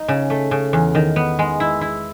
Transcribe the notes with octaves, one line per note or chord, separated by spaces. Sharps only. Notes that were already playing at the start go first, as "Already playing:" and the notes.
Already playing: D#4
C#3
A3
C#3
E2
D#3
B3
G#3
E4
E4